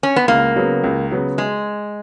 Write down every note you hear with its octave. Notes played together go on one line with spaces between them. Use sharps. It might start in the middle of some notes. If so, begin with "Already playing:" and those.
C#4
B3
C#2 A#3
C#3 F#3 B3
C#2
C#3 F#3 B3
G#3